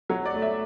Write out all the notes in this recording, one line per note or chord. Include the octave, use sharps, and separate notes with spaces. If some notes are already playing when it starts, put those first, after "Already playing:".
F#3 C#5
D5
A3
E5